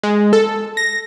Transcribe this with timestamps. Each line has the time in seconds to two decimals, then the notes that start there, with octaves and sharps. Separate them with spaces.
0.03 G#3
0.33 A4
0.77 A#6